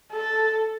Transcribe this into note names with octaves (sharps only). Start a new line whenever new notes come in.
A4